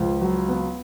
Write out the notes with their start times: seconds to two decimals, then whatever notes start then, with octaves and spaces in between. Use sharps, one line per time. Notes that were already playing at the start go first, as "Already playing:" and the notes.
Already playing: C#2 F3
0.21 F#3
0.48 B3